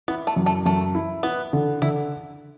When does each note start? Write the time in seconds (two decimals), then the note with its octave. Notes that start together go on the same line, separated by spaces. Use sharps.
0.08 B3 E4
0.27 A3
0.36 F#2
0.46 A3
0.66 F#2 A3
0.95 E4
1.23 B3 E4
1.53 D3
1.82 D3 E4